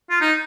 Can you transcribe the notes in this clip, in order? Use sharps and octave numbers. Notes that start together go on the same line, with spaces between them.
F4
D#4